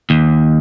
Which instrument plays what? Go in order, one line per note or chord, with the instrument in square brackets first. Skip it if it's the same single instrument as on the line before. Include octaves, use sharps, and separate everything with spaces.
[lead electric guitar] D#2